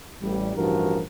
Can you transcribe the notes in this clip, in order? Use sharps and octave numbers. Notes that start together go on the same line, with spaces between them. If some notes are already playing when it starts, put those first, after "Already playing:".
A1 G3
A1 G2 E3 F3 F#4 A#4